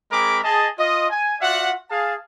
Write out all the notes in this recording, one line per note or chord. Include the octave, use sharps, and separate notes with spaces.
G#3 C4 G#4 A#4 B5 D6
G#4 D#5 A5
F4 D#5
G#5
F4 F#4 D5 E5 F#5
G#4 F5 A5